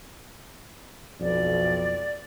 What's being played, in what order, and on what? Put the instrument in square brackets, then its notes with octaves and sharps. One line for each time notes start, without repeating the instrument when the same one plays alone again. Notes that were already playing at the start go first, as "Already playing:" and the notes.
[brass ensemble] B1 F2 [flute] D5